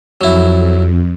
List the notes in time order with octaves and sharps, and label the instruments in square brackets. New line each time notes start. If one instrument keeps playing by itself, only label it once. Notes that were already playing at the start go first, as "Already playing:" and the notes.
[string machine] F2 [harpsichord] F#3 E4